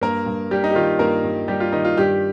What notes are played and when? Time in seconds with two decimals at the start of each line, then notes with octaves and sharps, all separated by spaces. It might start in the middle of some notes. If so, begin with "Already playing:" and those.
0.01 G2 A#3 A#4
0.26 G2
0.51 G3 G4
0.64 D#4
0.70 G4
0.75 D#3 F4
0.99 G2 A#3 A#4
1.24 G2
1.48 G3 G4
1.60 F4
1.72 D#3 D#4
1.85 F4
1.97 G2 G3 G4